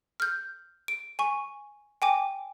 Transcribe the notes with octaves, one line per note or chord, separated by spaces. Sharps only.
F6 G6
D7
G#5 C#6
G5 G#5 D6